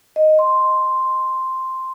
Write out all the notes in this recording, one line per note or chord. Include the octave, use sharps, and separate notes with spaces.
D#5
C6